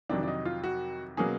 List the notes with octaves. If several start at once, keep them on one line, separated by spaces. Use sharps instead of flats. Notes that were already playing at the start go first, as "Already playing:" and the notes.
F2 C3 D#3 F#3 D4
D4
D#4
F4
F#4
B2 F#3 A#3 C#4 G#4